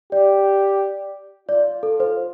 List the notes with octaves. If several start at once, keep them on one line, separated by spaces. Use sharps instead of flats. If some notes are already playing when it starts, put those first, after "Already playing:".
G4 D5
F4 D5
A4
C5